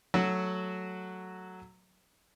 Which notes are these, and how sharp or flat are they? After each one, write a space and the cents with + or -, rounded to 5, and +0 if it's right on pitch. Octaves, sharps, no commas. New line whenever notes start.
F#3 +0 A3 +0 F#4 +0